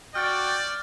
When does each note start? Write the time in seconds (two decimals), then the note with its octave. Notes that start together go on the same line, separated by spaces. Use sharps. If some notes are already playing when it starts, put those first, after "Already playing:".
0.15 F#4 D5 G5 F6 A6